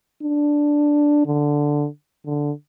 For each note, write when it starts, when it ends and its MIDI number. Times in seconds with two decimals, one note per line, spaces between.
0.23 1.24 62
1.26 1.87 50
2.26 2.52 50